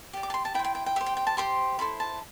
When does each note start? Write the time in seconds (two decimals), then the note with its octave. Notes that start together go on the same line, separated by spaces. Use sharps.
0.13 G4 D5
0.23 D6
0.30 A5
0.34 C6
0.45 A5
0.54 E4 G5
0.59 C5
0.64 G5
0.75 G5
0.86 G5
0.96 G4 E5
1.01 C5
1.06 G5
1.17 G5
1.27 A5
1.37 G4 C5 C6
1.79 E4 A4 C5 C6
2.00 A5